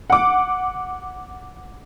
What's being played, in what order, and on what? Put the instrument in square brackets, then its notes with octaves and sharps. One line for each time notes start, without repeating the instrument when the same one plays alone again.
[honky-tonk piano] F#5 D6